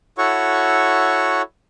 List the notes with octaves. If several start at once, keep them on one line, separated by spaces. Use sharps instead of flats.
E4 F#4 A4 C#5 F#5 C#6